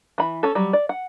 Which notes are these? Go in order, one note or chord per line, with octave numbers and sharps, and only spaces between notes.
E3 B5
C#4 A4
F#3 G3
D5
F#5